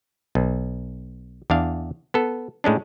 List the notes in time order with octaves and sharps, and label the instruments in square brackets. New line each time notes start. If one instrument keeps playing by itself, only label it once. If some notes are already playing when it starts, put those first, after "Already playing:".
[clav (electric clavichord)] B1
E2 D4 F5
B3 A4
A2 G#3 C#4 D4